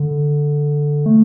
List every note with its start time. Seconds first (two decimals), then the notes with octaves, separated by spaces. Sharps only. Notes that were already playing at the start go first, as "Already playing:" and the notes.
Already playing: D3
1.06 A3